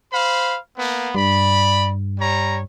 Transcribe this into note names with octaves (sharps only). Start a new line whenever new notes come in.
C5 F5 B5
A#3 B3
G2 D5 B5
G3 C#5 A#5